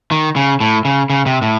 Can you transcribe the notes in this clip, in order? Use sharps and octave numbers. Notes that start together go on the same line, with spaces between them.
D#3
C#3
A2
C#3
C#3
C3
A2